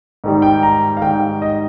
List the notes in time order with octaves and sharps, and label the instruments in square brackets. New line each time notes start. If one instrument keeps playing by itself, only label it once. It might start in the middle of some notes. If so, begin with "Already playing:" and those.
[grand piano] G#2 D#3 G3
G5
A#5
F5
G#2 D#3 G3 G5
D#5